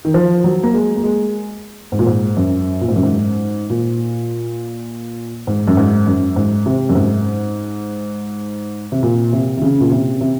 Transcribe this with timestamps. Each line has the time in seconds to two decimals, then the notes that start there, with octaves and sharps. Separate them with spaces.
0.05 D#3
0.14 F3
0.44 F#3
0.63 A#3
0.74 G#3
0.96 A#3
1.03 G#3
1.92 G#2
1.99 A#2
2.06 G#2
2.37 F#2
2.81 A#2
2.88 G#2
2.96 F#2
3.03 G#2
3.70 A#2
5.47 G#2
5.68 F#2
5.77 G#2
6.07 F#2
6.36 G#2
6.66 C3
6.89 F#2
6.95 G#2
8.92 C3
9.03 A#2
9.33 C3
9.57 C3
9.62 C#3
9.80 A#2
9.91 C3
10.21 C3